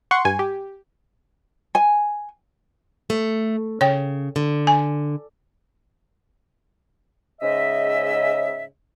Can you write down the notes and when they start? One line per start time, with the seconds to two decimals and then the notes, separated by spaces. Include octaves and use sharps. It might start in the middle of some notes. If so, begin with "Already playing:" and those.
0.11 F#5 C6 C#6
0.25 G2 G#5
0.39 G4
1.75 G#5
3.10 A3
3.81 C#3 C#5 G5
4.36 D3
4.67 G#5
7.41 G#2 C#3 D#5 E5